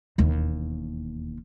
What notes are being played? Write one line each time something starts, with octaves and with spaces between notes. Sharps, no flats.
E1 D#2